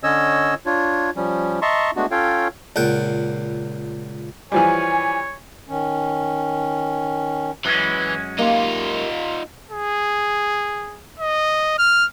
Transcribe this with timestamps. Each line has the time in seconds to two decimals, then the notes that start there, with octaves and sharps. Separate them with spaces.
0.03 D3 C#4 C#5 D#5 E6
0.66 D4 F4 C#5
1.16 F3 G3 C#4
1.62 D#5 E5 A5 A#5 C6 C#6
1.96 G#3 A3 B3 D4 F#4
2.11 C#4 F4 A4 C#5 F5 G5
2.76 C#2 A#2 F#5 G5
4.52 E3 F3 G3 C#5 G#5
5.68 D#3 C#4
7.65 F#2 E3 G#3 C#4
8.39 A#3 D#4 F4 G4 F5
9.71 G#4
11.20 D#5
11.78 F6